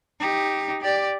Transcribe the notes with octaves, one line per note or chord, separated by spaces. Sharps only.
D#4 G4
G4 D5